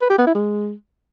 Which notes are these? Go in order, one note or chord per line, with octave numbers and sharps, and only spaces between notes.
B4
G4
B3
E4
G#3